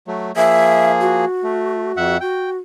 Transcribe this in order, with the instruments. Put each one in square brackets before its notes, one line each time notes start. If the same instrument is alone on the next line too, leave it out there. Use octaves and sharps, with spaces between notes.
[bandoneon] F#3 A3
[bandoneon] F3 A#3 G#4 [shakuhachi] E5
[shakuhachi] F#4
[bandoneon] A3
F2 E5 F#5
[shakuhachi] F#4 [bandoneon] G5